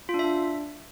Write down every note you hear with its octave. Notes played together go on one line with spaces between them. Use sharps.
F4
D4
E5
D4